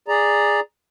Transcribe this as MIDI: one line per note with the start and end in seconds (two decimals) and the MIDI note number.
0.08 0.60 68
0.08 0.60 74
0.08 0.60 82